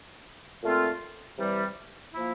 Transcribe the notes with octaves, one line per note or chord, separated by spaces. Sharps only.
A#2 A3 C4 F4
C3 E3 G3
F3 A#3 E4